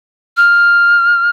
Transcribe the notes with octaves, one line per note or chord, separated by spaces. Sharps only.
F6